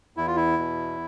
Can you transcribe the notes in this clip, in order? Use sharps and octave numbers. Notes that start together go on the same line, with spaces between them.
E2 E4
F4
E4
B2